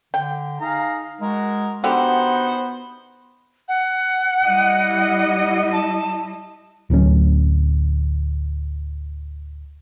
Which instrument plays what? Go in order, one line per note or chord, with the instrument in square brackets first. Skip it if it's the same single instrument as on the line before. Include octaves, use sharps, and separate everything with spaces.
[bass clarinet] D3 [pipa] G5
[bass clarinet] D#4 [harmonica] G#4 F5 A#5
[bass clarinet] G#3 [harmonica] F#4 A#4
[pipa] D3 F#4 G4 [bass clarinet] B3 [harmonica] D#4 C5 F#5
[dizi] F#5
[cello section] G3 E4 D#5
[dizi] A5
[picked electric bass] D1 D2 F#3 C#4